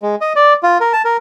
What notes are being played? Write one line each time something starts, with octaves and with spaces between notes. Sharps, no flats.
G#3
D#5
D5
F4
A#4
A5
A#4